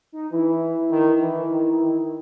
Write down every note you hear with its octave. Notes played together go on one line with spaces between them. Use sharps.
D#4
E3 E4
D#3
E3
D#3
D#3